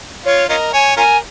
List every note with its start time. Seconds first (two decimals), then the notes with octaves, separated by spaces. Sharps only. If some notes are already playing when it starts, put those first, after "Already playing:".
0.25 F4 C#5
0.49 C#4 F4 A#4 D#5
0.73 C#5 G#5
0.97 C#4 F4 A#4 G#5